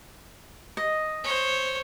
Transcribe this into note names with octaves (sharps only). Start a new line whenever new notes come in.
D#5
C5 C#5